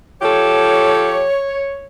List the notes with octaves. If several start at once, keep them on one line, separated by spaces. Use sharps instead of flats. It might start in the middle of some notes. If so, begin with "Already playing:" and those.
F3 G4 A4 C#5